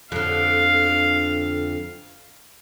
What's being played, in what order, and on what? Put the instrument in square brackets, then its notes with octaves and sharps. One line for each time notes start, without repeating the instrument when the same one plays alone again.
[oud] F2 D3 [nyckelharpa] F5